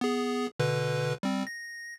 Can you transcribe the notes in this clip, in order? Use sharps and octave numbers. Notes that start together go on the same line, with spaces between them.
B3 G#4
B2 D3 B4
G3 C4
A#6